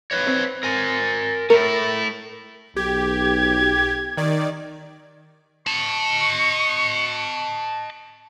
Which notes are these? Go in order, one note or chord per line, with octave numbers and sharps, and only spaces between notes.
B4 C#5
C4
A#4 G#5
A3 E4 A#4
B1 G4 G#6
D#3 D5
D#5 A5 C#6